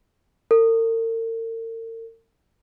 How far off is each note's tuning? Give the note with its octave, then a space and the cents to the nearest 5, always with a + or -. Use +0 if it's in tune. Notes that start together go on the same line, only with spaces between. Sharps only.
A#4 -45